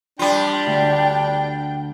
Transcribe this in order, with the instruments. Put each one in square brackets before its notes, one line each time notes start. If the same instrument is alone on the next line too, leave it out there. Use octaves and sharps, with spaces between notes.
[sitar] G3 F4 [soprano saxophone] D4 [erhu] G5
[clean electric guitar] D2